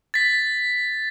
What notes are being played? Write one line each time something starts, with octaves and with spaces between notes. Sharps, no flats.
A6 B6